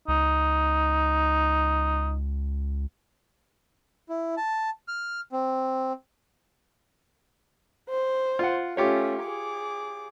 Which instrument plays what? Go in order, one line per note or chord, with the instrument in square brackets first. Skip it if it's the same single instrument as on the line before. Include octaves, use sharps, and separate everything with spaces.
[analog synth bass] C#2 [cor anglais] D#4
[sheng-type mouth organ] E4
A5
F6
C4
[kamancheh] C5
[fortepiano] F4 F#5
[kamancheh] A3 C#4 [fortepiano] F4 G4 C#5
[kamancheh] G#4 D6